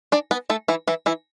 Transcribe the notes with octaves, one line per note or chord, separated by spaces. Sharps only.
D4 D5
B3 B4
A3 A4
E3 E4
E3 E4
E3 E4